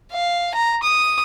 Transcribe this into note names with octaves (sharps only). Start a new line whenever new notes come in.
F5
A#5
D#6